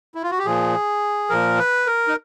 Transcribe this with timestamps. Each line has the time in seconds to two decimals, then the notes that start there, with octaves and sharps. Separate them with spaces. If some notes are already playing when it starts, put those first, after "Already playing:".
0.15 E4
0.23 F4
0.31 F#4
0.39 G4
0.46 A#2 F3 G#4
1.30 A#2 F3 A#4
1.58 B4
1.86 A#4
2.08 D#4